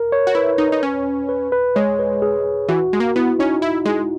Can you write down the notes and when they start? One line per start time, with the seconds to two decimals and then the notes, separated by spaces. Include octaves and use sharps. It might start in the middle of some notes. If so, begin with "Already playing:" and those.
Already playing: A#4
0.12 C#5
0.27 F#4
0.35 E4 B4
0.58 D#4
0.72 D#4
0.83 C#4
1.29 B4
1.52 B4
1.76 G#3 C#5
1.99 B4
2.22 G#4
2.69 E3 F#4
2.93 G#3
3.00 A#3
3.16 B3 E4
3.39 C#4 D#4
3.62 E4
3.85 G#3